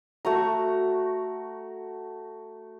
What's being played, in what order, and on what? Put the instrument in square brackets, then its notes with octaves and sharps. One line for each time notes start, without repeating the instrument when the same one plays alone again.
[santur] A3 F#4 A#5